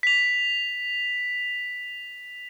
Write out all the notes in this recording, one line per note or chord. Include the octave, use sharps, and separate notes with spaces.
B6 F7